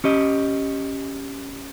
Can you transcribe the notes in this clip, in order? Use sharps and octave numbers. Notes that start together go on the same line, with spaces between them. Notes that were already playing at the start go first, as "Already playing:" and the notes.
C#4 G4 D#5